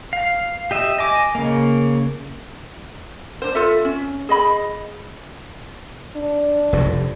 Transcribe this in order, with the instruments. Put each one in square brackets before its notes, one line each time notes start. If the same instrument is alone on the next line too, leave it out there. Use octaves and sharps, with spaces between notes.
[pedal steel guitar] F5
G4 D#5 E5
D#5 G#5 D6
C#3 A#3
[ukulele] D4 C5
F4 A4 E5
C#4
G#4 D#5 B5
[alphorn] D4
[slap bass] F1 G2